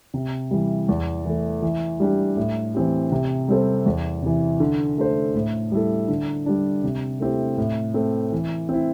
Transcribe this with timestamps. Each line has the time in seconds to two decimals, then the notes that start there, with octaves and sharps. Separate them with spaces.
0.14 C3
0.51 E3 G3
0.89 E2
1.25 E3 A3
1.62 E3
2.00 G3 D4 G4
2.37 A2
2.74 E3 C4 G4
3.12 C3
3.48 G3 C4 A4 C5
3.86 E2
4.23 C3 E3
4.60 D3
4.98 A3 D4 A4 C5
5.35 A2
5.72 G3 E4 A4
6.08 D3
6.46 G3 D4
6.84 C3
7.20 A3 C4 E4 G4
7.57 A2
7.94 A3 C4
8.32 E3
8.69 C4 E4